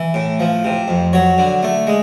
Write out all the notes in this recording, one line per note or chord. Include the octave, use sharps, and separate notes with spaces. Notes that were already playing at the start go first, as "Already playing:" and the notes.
Already playing: E3
A2
F3
C3
F2
F#3 C#5
D3
A3
G#3